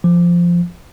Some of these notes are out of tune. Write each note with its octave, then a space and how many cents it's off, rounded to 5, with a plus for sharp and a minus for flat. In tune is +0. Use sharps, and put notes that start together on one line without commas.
F3 -10